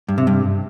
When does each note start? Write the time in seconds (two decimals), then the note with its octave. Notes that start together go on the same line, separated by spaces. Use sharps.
0.08 G2
0.18 C3
0.27 G2